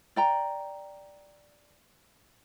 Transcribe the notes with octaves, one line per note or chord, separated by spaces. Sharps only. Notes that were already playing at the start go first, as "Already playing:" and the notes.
D5 G5 A#5